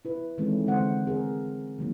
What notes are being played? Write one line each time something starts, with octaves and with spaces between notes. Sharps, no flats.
E4 B4
D#3 E3 G#3 A3 C4 C#4
D3 G#3 C4 C5 F#5
G#3 C4 G#4 A#4
D#3 F#3 A#3